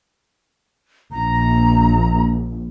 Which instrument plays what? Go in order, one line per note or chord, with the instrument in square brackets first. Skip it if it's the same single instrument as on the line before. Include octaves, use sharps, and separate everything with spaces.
[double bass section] A#1 [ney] A#5